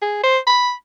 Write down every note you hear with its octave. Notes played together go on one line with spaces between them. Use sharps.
G#4
C5
B5